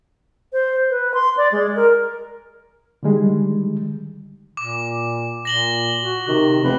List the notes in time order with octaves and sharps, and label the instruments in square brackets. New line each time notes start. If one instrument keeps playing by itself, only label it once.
[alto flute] C5
B4
C6
D5
G#3
A#4
[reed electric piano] D3 D#3 G3 G#3
[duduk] A#2 [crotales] D6
[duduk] A#2 [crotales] A#6 F#7 G7
[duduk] F#4
[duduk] C3 [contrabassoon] D#3
[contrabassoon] F1 [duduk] B4